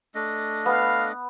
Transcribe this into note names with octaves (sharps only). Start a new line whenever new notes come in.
A3 D4 D#5
B3 F5